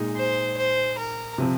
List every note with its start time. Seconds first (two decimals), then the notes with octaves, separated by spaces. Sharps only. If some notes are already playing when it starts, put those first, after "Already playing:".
Already playing: A#2 G#3 D#4 G#4
0.16 C5
0.57 C5
0.98 A#4
1.38 C3 F3 C4